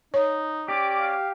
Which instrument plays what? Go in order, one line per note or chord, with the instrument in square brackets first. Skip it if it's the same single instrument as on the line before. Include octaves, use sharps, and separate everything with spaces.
[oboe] D#4 [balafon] C#5
[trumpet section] C#4 D5 D6 [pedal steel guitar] G4
[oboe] F5